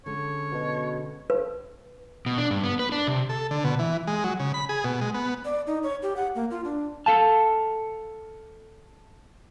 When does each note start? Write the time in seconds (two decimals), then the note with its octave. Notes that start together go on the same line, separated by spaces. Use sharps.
0.06 D3 G#3 C#4 C#5
0.52 B2
1.30 B4
2.26 B2
2.38 D4
2.51 G2
2.64 B3
2.79 B4
2.92 D4
3.07 C3
3.29 A4
3.51 D3
3.64 B2
3.79 E3
4.07 G#3
4.24 F#3
4.40 C#3
4.54 B5
4.69 G#4
4.84 B2
5.01 G#3
5.14 B3
5.45 D5
5.67 D#4
5.83 C#5
6.02 G4
6.16 F#5
6.35 A#3
6.51 F4
6.65 D4
7.06 A4 F5 A5